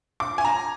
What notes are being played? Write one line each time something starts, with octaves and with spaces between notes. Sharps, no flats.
D6
G#5
A#5